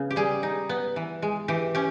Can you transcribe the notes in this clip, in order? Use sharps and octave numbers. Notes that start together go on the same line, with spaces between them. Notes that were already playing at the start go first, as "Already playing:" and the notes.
Already playing: C#3 B3
G4
G3 G#4
D#4
B3
E3
G#3
E3 G4
C#4 G4